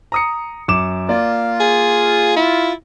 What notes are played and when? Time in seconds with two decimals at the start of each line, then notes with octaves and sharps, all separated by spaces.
0.12 A#5 D#6 C#7
0.68 F#2 D6 E7
1.09 A#3 F4 D5
1.60 G#4
2.37 E4